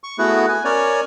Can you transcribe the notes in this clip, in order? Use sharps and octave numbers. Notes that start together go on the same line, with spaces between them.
C#6
A3 B3 E4 F#4 G#4 B4
G#5
C#4 A#4 C#5 D5 G#5